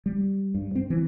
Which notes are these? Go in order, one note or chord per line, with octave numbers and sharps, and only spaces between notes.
G3
G2
C4
E3